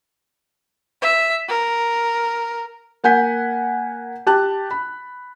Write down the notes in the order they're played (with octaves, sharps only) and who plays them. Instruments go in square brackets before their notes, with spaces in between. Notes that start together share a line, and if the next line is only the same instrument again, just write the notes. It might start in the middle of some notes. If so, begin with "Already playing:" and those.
[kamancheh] E5
A#4
[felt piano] A#3 F#5 G#5 G6 B6
G4 A5 F#6
B5